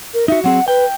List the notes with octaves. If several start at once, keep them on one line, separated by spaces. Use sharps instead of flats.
A#4
D#4 F#4 E5
F#3 C4 G#4 F#5
B4 G5